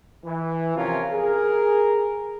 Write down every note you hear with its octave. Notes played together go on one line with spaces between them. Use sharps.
E3
C3 F3 C#4 F4 A#4
G#4 A#4